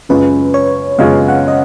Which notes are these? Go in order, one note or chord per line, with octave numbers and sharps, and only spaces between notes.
F#2 C#3 G#3 C#4 F4 B4
C#5
F#2 C#3 G#3 C#4 F4 F5
F#5
D#5